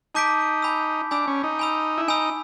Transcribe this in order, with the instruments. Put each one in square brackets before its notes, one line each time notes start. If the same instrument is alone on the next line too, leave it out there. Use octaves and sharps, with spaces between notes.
[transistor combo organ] D#4 [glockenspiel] A5 D6 G6 B6 D7
[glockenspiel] G#5 B5 E6
[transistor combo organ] D4 [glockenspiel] G#5 B5 E6
[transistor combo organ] C#4
D#4
[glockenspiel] G#5 B5 E6
[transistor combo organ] E4
[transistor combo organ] D#4 [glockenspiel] G#5 B5 E6